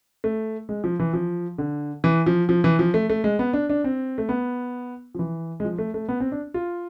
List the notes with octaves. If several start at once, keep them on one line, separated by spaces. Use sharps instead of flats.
A3
G#3
F3
E3
F3
D3
E3
F3
F3
E3
F3
A3
A3
G#3
B3
D4
D4
C4
A3
B3
F3
E3
G#3
F3
A3
A3
B3
C4
D4
F4